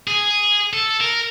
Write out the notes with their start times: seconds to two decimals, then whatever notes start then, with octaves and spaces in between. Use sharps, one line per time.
0.07 G#4
0.73 A4
1.01 A#4